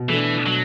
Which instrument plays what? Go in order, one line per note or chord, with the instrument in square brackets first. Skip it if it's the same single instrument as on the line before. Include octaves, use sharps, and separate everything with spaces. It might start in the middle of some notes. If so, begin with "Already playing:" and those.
Already playing: [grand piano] B2
[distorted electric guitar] E3 [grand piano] A3 D4
[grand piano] B2 [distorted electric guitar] F#3